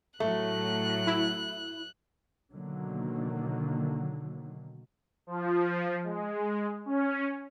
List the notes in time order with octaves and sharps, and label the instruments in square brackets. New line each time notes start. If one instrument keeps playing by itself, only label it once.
[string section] A2 F#3 [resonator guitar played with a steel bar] A3 [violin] F#6
[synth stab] E4
[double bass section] B2 D3 D#3 F#3 A#3
[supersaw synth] F3
G#3
C#4